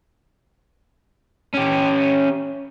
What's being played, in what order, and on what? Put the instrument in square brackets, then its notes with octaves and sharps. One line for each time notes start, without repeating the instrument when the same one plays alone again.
[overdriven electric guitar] C#4 G4